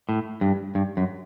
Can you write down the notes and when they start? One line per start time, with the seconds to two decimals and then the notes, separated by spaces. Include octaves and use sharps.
0.09 A2
0.41 G2
0.75 G2
0.97 F#2